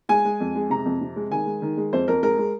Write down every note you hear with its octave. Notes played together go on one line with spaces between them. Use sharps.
G#3 G#5
G#3
F2
G#3
C3 A#5
F2
C3
G#3
D#3 G#5
G#3
D#3
G#3
F2 C5
F2 A#4
G#3 A#4
G#3